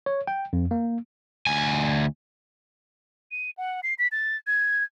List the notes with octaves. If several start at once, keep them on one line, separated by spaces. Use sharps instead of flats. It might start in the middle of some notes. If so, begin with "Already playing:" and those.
C#5
G5
F2
A#3
D2 G#5
D#7
F#5
C7
B6
A6
G#6